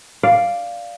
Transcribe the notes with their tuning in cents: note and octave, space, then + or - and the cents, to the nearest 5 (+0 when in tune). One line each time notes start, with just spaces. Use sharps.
D5 +0 F5 +0